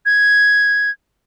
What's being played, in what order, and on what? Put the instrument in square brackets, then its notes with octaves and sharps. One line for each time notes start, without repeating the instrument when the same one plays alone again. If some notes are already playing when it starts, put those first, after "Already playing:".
[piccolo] G#6